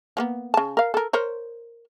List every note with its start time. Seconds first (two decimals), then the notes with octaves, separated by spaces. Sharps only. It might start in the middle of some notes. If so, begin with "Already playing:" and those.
0.17 F3 A#3 B3
0.54 C#3 A5
0.77 A#4 F5
0.94 A4 A#4
1.13 A#4 C5 C#5